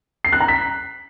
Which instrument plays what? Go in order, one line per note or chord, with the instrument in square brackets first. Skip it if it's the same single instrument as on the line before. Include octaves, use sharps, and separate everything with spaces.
[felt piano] C7
F#6
A#5
B6